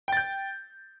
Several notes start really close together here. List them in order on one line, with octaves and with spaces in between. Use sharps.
G5 A6 G6